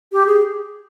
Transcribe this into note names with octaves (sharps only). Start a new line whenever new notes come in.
G4
G#4